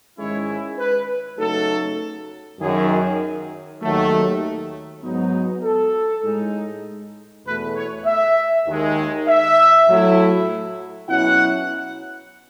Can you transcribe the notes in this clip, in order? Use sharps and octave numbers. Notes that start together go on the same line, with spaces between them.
G#2 D#3 G#3 C#4 E4 C#5
B4
C#3 F#3 A3 D#4 A4
F#2 D#3 F#3 G#4
D#2 D#3 F#3 A3
G#2 F#3 B3 D#4
A4
A2 G#3 D#4
E2 B2 A3 B4
C#5
E5
D#2 D#3 G#3
E5
A2 F#3 A3 E4
B2 F#3 C#4 E4 F#5